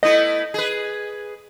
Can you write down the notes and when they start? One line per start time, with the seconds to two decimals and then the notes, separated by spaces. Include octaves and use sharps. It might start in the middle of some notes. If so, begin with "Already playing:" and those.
0.03 A3 B3 E4 D#5
0.54 G#4 B4